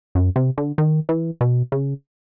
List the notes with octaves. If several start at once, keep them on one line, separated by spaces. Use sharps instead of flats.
F#2
C3
D3
D#3
E3
B2
C#3